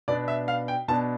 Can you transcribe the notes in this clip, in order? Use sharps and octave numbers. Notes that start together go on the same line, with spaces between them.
B2 B3 D4 D5
E5
F5
G5
B2 B3 D4 A5